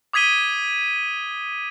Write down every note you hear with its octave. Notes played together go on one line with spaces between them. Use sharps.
D6 D#6 G#6 B6 D#7 G7